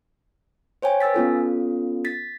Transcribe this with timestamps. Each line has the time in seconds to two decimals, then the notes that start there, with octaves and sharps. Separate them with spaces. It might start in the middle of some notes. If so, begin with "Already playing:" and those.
0.82 C5 C#5 G5 G#5
1.00 B4 G#5 E6 A6 B6
1.14 B3 C#4 F4 A4
2.05 A6 B6